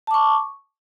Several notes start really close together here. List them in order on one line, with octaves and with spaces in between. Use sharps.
A5 D6 C#6